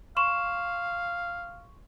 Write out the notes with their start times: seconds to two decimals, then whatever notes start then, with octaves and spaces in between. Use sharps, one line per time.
0.17 F5 C6 C#6 E7